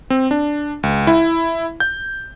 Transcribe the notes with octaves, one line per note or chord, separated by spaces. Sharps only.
C4
D4
C#2
E4
G6